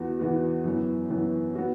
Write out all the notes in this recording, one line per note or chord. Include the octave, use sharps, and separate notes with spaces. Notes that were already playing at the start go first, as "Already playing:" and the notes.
Already playing: E2 E3 B3 F#4
E2 E3 B3 F#4
F#2 E3 B3
F#2 E3 B3
B3 F#4